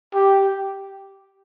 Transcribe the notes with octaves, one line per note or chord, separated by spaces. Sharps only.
G4